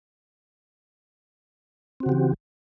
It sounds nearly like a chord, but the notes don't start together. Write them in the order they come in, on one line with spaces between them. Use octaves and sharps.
C4 F#4 C#3 G4 E3